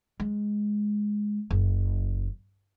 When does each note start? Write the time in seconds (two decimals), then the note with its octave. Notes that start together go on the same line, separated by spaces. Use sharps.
0.20 G#3
1.50 F#1